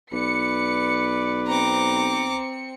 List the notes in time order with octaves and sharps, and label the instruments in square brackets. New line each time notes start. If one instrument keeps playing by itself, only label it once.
[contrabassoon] B1 [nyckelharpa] B4 D5 [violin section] C#7
[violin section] C4 C#7 [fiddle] A#5 D6